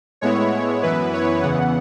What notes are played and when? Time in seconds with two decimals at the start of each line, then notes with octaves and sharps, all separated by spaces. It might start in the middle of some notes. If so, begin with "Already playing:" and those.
0.21 A2 G#3 B3 E4 C#5
0.83 F#2 E3 B3 E4 B4
1.13 C#5
1.42 E2 C#3 E3 B3 F#5